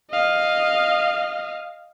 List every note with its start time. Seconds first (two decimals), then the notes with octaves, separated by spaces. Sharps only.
0.11 D#5 F5